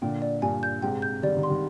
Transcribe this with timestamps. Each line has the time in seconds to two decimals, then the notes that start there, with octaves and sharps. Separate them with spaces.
0.02 A#2 D3 G5
0.22 D5
0.42 G2 A#2 G#5
0.63 G6
0.82 G#2 C3 G5
1.02 G6
1.23 D#3 G3 D5
1.36 D#3 G3
1.43 C6
1.49 D#3 G3